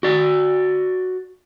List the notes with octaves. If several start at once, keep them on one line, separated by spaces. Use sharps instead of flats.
F#4 D5